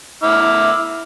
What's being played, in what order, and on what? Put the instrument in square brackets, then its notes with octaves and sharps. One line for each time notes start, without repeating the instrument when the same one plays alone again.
[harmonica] E4 D6 F6